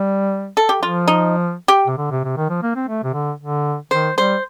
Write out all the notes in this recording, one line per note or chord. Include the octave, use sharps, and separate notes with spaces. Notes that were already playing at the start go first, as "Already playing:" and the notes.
Already playing: G3
A4
G4
F3 F4
D#4
G4
C3
D3
C3
C3
D#3
F3
A#3
C4
A3
C3
D3
D3
D#3 C5
G3 C5